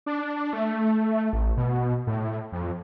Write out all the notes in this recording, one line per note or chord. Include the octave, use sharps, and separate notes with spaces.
D4
A3
A1
B2
A2
F2